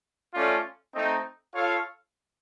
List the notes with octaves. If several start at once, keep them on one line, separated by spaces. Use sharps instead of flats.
A3 C#4 F4 A4 D5
A3 C4 D#4
F4 A4 C#5 F5